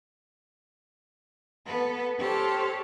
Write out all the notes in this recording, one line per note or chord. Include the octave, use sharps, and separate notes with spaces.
B3 A4 B4
G4 A4 C5 C#5 A5 F6